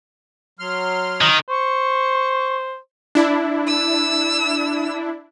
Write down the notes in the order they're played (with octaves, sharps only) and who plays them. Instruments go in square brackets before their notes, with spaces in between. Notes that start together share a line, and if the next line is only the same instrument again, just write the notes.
[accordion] F#3 C6 F6
[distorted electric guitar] D#3
[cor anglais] C5 [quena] C#6
[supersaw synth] D4 E4
[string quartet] E6